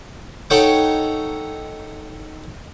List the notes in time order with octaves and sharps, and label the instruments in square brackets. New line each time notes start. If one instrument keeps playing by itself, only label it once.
[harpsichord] D#4 A4 C#5 F#5 G5 C#6